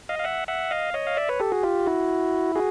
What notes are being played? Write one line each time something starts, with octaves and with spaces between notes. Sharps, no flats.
D#5 F5
F5
E5 F#5
E5 F#5
D#5 F5
C#5 D#5
F5
D5 E5
B4 C#5
G4 A4
F#4 G#4
F4 G4
E4 F#4
F#4 G#4